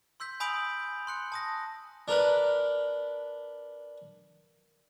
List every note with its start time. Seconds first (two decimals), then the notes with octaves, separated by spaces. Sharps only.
0.20 C6 E6 G6 B6
0.40 G#5 B5 D#6 G6 D7 F#7
1.07 C6 F#6 C#7
1.32 A5 D#6 A#6
2.08 D4 A#4 B4